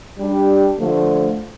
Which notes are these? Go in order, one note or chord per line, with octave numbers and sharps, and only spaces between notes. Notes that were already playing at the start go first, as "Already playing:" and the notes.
G3 D4 G4
D3 F3 A3